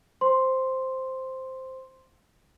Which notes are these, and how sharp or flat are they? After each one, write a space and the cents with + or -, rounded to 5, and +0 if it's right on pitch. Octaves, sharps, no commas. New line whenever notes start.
C5 +0 C6 +0